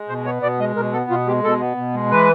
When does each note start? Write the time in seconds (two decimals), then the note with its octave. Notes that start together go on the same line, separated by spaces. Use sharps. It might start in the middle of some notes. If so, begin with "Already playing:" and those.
Already playing: G#3
0.09 B2 C5
0.25 B3 C#5
0.42 B2 D5
0.59 G#3 D#5
0.76 B2 A#4
0.93 B3 A4
1.10 B2 F4
1.27 G#3 G4
1.44 B2 A4
1.61 B3
1.77 B2
1.94 G#3
2.11 E3 B4